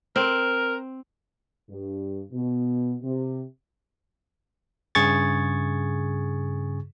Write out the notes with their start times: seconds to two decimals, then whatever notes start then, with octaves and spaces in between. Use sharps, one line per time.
0.16 C4 A#4
1.69 G2
2.33 B2
3.02 C3
4.95 G2 C#3 G#4 C#6 G#6 A6